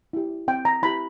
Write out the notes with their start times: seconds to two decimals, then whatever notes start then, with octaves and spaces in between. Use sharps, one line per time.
0.13 E4 G4
0.48 C4 G5
0.65 A#5
0.82 E4 G4 B5